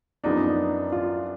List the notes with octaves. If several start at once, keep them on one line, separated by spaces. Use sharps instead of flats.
F#2 F3 B3 D4 D#4
F4